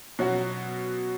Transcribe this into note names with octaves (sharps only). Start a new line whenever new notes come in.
B2 F#3 C#4 F#4